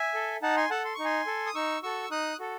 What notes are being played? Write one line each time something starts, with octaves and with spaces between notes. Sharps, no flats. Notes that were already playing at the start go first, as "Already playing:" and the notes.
Already playing: E5 G#5
A4
D#4 F#5 A5
G#5 C6
A4 F#5 A5
C6
D#4 C#6
G#5 C6
A4
D#6
D#4 C#6 E6
F#4 A4 C#6 E6
D#4 D#6 F#6
F#4 A4